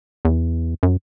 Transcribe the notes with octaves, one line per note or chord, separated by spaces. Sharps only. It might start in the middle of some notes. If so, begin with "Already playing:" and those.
E2
F#2